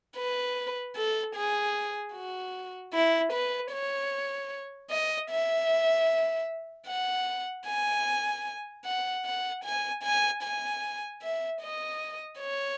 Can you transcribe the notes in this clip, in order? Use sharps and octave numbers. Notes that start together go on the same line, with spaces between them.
B4
A4
G#4
F#4
E4
B4
C#5
D#5
E5
F#5
G#5
F#5
F#5
G#5
G#5
G#5
E5
D#5
C#5